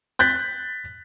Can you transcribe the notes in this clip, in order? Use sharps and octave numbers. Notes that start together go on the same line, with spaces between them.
F#6 G6 A6 B6